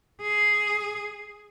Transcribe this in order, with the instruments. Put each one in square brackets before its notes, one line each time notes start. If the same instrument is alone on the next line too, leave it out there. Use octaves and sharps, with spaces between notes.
[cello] G#4